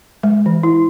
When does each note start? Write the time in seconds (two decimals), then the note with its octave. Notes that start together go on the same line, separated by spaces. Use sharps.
0.23 G#3
0.46 E3
0.63 E4